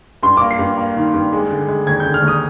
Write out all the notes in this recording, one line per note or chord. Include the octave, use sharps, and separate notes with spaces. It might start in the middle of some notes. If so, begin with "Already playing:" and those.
G2 C6
A#3 D6
C7
G2
A#3
D#3
G2
G#3
D3
G#3
D#2 G#6
D3 G6
F6
D#2
D#6